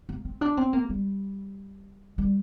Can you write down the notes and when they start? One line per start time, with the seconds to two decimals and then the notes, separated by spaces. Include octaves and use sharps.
0.09 A#3
0.25 C4
0.41 D4
0.57 C4
0.73 A#3
0.89 G3
2.18 G3